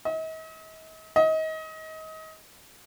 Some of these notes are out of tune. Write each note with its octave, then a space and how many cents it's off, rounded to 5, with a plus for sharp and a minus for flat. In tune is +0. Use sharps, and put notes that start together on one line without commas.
D#5 +45
D#5 +30